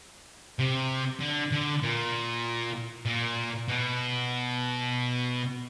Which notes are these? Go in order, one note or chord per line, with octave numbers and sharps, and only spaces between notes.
C3
D3
D3
A#2
A#2
B2